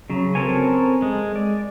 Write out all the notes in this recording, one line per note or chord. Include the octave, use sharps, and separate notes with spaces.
C#3 F#3
C4 A4 A#4 C#5 G#5
G#3
D5